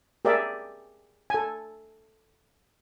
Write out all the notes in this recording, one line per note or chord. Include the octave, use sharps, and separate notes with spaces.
G4 G#4 A#4 D5 E5
A4 G#5